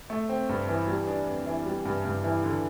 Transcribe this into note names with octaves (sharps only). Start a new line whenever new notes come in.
A3
C4
G2
E3
G3
D4
F2
E3
G3
G2
G2
E3
D3